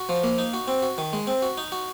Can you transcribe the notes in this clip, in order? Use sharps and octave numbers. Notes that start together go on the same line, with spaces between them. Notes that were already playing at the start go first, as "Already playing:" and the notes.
Already playing: F#4
F3
A#3
D#4
F#4
C4
F#4
D#3
G#3
C4
F#4
D#4
F#4